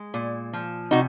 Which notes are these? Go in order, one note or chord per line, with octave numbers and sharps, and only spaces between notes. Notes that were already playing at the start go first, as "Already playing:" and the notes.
Already playing: G#3
A#2
F3
C3 D#4 F#4